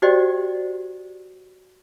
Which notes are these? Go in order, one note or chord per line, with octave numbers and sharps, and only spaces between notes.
F#4 G4 C5 D5 D#5 G5